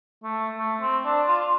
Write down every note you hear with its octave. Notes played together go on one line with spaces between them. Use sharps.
A3
A3
C4
D4
F4